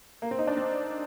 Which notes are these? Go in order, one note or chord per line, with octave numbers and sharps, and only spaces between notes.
A#3
C4
D#4
D4
C4